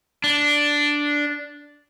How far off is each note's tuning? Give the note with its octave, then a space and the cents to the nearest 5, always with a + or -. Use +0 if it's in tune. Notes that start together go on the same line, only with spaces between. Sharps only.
D4 -5